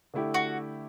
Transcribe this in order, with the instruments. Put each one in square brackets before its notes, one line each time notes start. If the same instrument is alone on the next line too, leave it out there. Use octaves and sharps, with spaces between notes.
[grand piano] D3 A3 E4 G4
[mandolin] F#4